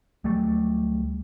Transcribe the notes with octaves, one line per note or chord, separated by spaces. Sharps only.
D2 F#3 G3 A3